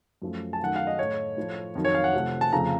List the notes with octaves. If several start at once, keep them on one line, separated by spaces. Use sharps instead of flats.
F#2 F3 A3
A5
F#2 D#3 A3 F#5
F5
D#5
A2 A3 C#5
A2 F3 A3
F2 D#3 F#3
C#5
F5
F#5
C3 F3 A3
A5
F2 C#3 F3 A3 A#5